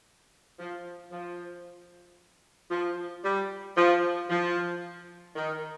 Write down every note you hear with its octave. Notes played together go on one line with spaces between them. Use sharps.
F3
F3
F3
G3
F3
F3
D#3